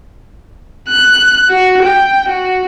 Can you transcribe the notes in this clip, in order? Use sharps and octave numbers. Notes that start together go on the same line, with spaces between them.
F#6
F#4
G5
F#4